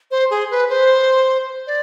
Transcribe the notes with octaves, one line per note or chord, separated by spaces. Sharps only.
C5
G#4
B4
C5
D5